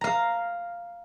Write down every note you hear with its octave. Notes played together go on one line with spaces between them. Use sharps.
F5 A#5